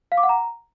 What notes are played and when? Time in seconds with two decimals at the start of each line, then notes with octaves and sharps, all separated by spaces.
0.12 F5
0.17 D6
0.23 F#5
0.29 A#5